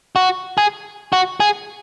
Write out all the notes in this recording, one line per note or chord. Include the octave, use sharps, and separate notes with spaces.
F#4
G#4
F#4
G#4